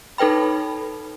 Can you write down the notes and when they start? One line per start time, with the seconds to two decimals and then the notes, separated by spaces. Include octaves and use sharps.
0.18 D#4 A4 B4 G5 B5